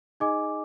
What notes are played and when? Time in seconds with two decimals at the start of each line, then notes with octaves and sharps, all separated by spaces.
0.20 D#4 G#4 D#5 G#5 D6